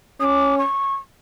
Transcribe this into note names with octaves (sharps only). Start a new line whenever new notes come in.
C#4 D6 D#6
C#6